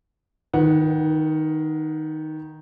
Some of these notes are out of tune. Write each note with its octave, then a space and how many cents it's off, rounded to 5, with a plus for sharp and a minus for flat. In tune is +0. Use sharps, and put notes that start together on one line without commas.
D#3 +0 B4 -25 F#5 +0